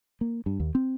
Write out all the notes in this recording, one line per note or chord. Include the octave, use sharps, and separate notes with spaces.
A#3
G2
D#2
C4